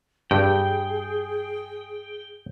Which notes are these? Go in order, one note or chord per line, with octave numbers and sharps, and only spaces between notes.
G2 G#4 G5